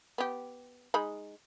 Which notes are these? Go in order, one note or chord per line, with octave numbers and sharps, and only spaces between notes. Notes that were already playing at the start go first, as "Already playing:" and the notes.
B3 G4
G#3 D#4 B5